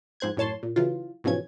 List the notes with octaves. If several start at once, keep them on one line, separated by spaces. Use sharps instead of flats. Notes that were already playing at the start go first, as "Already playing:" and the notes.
F2 G#2 C5 F#6 G#6
F#2 A2 C#5 A5 C6
A#2
C#3 E3 F#3 F4
G#2 B2 E3 F3 C#4 G#6